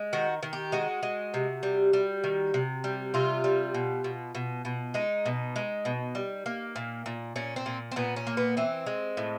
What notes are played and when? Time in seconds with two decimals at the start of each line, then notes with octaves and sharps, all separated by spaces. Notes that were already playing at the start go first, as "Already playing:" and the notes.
Already playing: G#3
0.13 D#3 F#4
0.43 D#3
0.53 G4
0.72 G#3 F#4
1.03 G#3
1.34 C3
1.63 G3
1.93 G3
2.24 D#3
2.54 C3
2.84 G3
3.14 C3 F4
3.44 G3
3.74 B2
4.04 B2
4.35 B2
4.65 B2
4.94 G#3 D#4
5.25 B2
5.56 G#3
5.85 B2
6.15 G3
6.46 A#3
6.76 A#2
7.06 A#2
7.36 A#2 C#4
7.56 C4
7.66 A#2
7.91 C4
7.96 A#2 B3
8.16 C#4
8.27 A#3
8.37 B3
8.57 E3 C4
8.86 G#3
9.17 A2